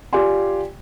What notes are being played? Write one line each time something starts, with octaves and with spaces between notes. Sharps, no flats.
F4 G4 D5 G5 G#5 C6